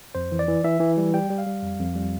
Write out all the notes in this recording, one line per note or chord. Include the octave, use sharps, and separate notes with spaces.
F2 C5
E3
D5
E3
E3 E5
E3
G3
G3 G5
G3
F5
G3
F2
F2
G3